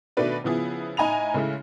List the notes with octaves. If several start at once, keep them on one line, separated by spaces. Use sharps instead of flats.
B2 D#3 A3 D4 B4 D5
C#3 F3 B3 E4 G#4
A2 D#4 G#5 A#5 B5 F7
C#3 G#3 A3 E4